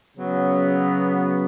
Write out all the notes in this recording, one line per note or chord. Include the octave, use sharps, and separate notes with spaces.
C#3 F#3 B3